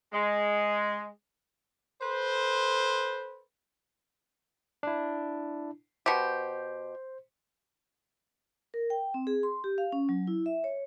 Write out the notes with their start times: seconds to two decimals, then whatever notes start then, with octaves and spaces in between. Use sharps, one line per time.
0.13 G#3
2.01 A4 B4 C5
4.83 D4 E4
6.06 B2 G4 C5
8.74 A#4
8.90 G5
9.14 C4
9.27 G#4
9.43 C6
9.64 G4
9.78 F5
9.92 C#4
10.09 F#3
10.27 E4
10.46 E5
10.64 C#5